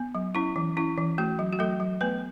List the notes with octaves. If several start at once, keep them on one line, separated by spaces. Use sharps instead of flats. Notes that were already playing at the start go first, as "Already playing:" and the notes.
Already playing: B3
F#3
C#4 E4
E3
C#4 E4
E3
A3 F#4
F#3
F#4
F#3 A3 A4
F#3
A3 B3 B4